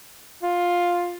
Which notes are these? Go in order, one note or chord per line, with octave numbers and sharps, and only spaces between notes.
F4